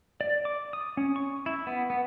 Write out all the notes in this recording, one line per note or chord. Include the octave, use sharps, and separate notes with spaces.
D5
D6
D#6
C#4
C#6
E4
B3
B3